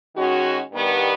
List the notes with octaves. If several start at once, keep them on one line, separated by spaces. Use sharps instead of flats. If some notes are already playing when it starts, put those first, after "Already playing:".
D#3 G#3 C#4 F#4
G2 D#3 G3 B3